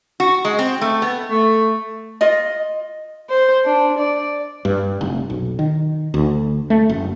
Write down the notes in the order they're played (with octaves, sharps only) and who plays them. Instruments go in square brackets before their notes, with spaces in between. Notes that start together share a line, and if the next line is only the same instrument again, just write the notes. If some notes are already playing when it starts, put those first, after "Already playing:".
[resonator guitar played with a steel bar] F#4
G#3
C4
A3
B3
[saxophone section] A3
[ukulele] F4 D#5
[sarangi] C5
D4
D5
[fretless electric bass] G2
F1
B1
D#3
D2
A3
F#1